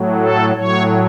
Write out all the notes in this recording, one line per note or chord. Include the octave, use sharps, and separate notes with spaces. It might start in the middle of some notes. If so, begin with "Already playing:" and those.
Already playing: A2 F#3
A4
A2 F#3 C#5